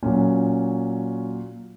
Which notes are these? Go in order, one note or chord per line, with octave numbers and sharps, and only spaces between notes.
A#2 F#3 C#4